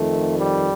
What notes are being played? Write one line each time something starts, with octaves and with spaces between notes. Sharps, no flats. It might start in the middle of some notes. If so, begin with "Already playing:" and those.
Already playing: F2 D#3 A3
G3